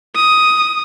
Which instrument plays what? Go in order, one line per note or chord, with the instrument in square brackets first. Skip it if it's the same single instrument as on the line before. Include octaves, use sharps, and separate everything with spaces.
[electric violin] D#6